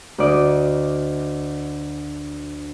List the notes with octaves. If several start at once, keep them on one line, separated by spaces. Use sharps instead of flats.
D2 D5 D#5